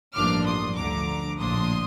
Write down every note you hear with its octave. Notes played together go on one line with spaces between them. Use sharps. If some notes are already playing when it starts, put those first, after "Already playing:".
A1 G2 F3 A#3 D4 D6 F6
C6 D#6
D2 D3 F3 A#5 D6
A#1 A2 F3 A#3 D4 C6 D#6